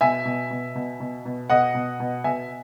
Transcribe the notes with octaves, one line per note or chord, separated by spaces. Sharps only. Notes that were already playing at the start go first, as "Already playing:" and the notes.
B2 E5 G#5
B2
B2
B2
B2
B2
B2 D#5 F#5
B2
B2
B2 E5 G#5